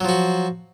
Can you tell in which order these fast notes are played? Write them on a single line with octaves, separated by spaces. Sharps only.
F#3 F3 F#4